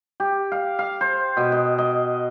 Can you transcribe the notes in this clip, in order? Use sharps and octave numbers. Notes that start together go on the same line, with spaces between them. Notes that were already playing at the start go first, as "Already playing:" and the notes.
G4
F5
F5
C5
B2
D#5
D#5